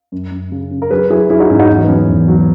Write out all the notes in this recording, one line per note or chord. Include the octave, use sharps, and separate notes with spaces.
F#2
F#2
C#3
C#3
A#4
F#3 G#4 B4
F#3 E4 G#4
F#3 E4 G#4
D#4 F#4
G#2 C#4 E4
D#4 F#4
E2
B3
F#3 C#4
E2
F#3